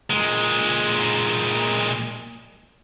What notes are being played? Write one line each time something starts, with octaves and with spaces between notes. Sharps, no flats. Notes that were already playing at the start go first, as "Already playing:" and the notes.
A#2 G#3